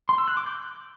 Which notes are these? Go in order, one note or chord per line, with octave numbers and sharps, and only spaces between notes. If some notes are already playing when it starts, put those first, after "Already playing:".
C6
E6
F#6
D6
G6